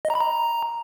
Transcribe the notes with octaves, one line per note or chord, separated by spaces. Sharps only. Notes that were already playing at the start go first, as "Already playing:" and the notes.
D#5
A#5
B5
A#5